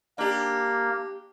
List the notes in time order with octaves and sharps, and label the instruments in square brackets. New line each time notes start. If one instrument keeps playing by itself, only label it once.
[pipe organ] A#3 [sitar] D4 G4